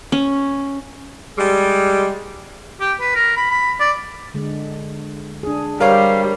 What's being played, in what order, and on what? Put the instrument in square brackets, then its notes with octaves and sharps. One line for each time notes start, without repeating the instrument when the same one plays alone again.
[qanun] C#4
[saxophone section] G3 G#3
[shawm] G4
B4
A#4
B5
B5
D5
[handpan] D3 G#3
D4 G#4
[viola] G3 [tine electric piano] A#4 C#5 [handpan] C5 [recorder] F5